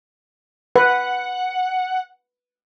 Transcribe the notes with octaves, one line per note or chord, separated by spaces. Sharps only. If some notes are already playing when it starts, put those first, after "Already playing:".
B4 F#5